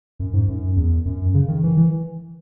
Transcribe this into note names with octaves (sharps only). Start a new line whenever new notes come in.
F#2
G#2
F#2
E2
F#2
C#3
D#3
E3
E3